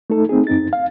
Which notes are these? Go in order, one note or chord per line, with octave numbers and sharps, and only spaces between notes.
A3 D#4 A4
A3 C4 D#4 G#4
F#2 C4 D#4 A6
F5